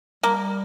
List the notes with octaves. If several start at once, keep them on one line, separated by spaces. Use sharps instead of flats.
G3 A#3